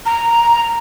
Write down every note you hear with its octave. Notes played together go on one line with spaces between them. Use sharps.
A#5